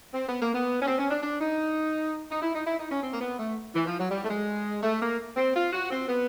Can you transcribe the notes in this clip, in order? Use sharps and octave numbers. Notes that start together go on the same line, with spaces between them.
C4
B3
A#3
B3
C#4
C4
C#4
D4
D4
D#4
D#4
E4
D#4
E4
D#4
C#4
C4
A#3
B3
A3
E3
F3
F#3
G3
A3
G#3
A3
A#3
C4
F4
F#4
C4
B3